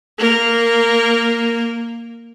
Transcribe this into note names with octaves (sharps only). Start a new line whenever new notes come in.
A#3 A#4